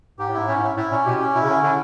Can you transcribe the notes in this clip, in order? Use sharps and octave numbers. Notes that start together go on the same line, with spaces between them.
G#2 G4
A2
G#2 E4
A2 C#4
G#2
E4
A2 E4
A#2 C#4
B2 G4
C#4
B2 E4
C#3
D3 C#4
D3 E4